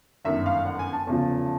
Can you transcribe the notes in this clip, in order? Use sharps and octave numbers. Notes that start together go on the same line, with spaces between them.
G1 F#2 D#3 E5
F5
F#5
G#5
A5
F1 E2 C#3 F3